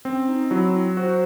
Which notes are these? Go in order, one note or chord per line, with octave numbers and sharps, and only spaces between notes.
C4 C#4
D#4
F#3 E4
F#4 C5